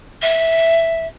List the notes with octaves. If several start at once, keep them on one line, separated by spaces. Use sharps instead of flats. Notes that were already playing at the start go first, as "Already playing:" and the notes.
E5